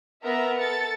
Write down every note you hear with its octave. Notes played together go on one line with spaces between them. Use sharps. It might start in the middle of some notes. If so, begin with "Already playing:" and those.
B3 A#4 E5 A#5
A4 A6 C#7